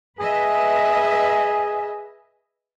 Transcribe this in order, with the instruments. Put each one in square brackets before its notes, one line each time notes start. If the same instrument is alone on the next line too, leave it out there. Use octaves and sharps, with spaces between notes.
[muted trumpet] G#4 [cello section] B4 D#5 E5